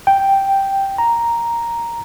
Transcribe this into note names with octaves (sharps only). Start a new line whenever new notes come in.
G5
A#5